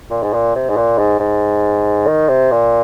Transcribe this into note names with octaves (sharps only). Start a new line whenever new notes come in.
A#2
G#2
A#2
C3
G#2
A#2
G#2
G#2
D#3
C3
A#2